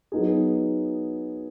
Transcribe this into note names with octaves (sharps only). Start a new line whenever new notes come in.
F#3 B3 D#4 G#4